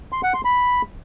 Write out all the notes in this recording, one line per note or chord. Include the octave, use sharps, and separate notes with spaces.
C6
F#5
C6
B5